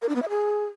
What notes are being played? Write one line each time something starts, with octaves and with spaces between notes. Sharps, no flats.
A#4
D4
B3
E5
G#4